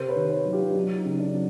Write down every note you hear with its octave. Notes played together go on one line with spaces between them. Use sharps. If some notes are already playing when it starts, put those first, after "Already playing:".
Already playing: C3 A#4 C5
B4 C#5
D#3
B4 C#5
F#3
F4 G4
D4
F#3 D#4
D#4
C#3
D4
F#3